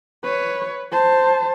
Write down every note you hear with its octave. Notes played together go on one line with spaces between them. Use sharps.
B4 C#5
C5 A5